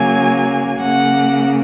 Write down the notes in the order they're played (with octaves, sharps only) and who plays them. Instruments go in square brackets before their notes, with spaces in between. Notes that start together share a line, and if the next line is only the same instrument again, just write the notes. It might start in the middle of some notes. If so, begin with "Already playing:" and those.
Already playing: [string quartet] C#3 F#3 A#3 G#5
C#3 A#3 F#5